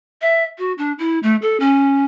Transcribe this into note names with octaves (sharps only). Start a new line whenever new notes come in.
E5
F#4
D4
E4
A3
A4
C#4